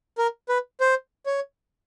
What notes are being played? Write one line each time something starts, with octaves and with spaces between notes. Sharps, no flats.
A#4
B4
C5
C#5